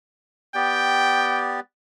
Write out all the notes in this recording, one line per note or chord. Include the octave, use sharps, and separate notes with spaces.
B3 G4 D5 G5